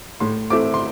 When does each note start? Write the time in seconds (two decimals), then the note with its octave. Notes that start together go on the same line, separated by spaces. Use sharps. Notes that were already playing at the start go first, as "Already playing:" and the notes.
0.20 A2 C6
0.50 A3 C4 E4 D6
0.74 C6